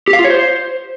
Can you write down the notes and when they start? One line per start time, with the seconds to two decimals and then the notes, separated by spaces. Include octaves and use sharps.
0.08 G4
0.13 F5
0.19 F4
0.24 C#5
0.30 C5